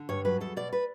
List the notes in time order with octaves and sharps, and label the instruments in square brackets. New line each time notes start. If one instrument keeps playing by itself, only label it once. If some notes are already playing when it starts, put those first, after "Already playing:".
Already playing: [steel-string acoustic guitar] D3
G2 C#5
F#3 B4
E2 A4
B2 D5
B4